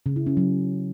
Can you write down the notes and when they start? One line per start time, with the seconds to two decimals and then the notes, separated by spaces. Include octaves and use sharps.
0.06 C#3
0.16 E4
0.27 C#4
0.37 F#3